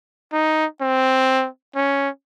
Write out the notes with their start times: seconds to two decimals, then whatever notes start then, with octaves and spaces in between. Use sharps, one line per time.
0.32 D#4
0.81 C4
1.76 C#4